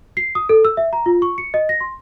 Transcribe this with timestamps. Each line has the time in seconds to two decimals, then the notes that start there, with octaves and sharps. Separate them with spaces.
0.17 C7
0.35 D#6
0.49 A4
0.65 E6
0.77 E5
0.93 A#5
1.06 F4
1.22 C#6
1.38 C#7
1.54 D#5
1.69 A#6
1.81 C6